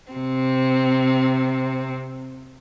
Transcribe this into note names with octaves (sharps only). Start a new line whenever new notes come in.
C3 C4